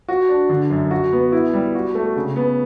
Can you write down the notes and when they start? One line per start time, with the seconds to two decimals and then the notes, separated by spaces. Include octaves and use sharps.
0.08 F#4
0.29 D4
0.49 D3
0.70 F#2
0.91 F#4
1.12 B3
1.32 E4
1.53 G3
1.75 F#4
1.95 A3
2.16 C#3
2.36 B3